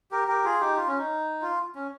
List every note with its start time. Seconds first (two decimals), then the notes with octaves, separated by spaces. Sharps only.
0.11 G4 A#4
0.28 G4 A#4
0.45 F4 G#4
0.60 D#4 G4
0.77 F4
0.87 C#4
0.98 D#4
1.42 F4
1.75 C#4